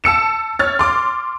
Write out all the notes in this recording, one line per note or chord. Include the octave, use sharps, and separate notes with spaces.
A5 E6 C#7 E7
C#5 F6 A6
C6 D6